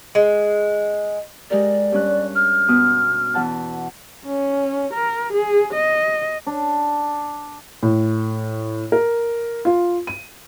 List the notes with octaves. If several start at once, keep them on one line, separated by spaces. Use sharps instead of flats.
G#3
G#3 G4 A#4 D5
G2 C#4 F#6
F6
B2 B3 D#6
E2 F#5 A5
C#4
A#4
G#4
D#5
D4
A2
A#4
F4
D#7